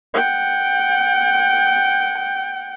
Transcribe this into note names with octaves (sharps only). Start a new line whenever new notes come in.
F#5 G5